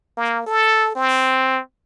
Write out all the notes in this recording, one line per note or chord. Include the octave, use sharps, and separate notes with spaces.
A#3
A4
C4